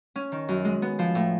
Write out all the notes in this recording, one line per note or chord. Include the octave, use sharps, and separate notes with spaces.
C#4
D#3
F#2
G#3
B3
F3
A2